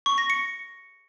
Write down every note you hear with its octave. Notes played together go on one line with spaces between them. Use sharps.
C#6
A#6
C#7